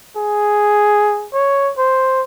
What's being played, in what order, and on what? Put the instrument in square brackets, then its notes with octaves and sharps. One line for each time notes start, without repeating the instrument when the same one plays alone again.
[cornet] G#4
C#5
C5